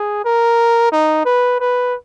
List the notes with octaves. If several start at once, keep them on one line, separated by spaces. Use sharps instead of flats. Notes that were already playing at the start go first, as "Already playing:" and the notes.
Already playing: G#4
A#4
D#4
B4
B4